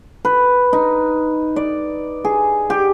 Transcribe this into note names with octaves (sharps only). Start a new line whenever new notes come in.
B4
D#4
D5
G#4
G4